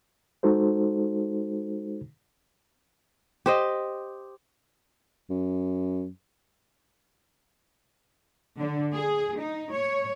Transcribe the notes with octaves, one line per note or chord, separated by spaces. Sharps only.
G#3 D#4 F#4 A4 C5
G4 C5 D#5
F#2
D3
G#4
D#4
C#5